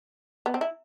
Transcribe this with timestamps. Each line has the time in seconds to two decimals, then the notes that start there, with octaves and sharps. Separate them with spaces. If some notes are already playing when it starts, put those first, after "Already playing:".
0.46 B3
0.54 C4
0.61 E4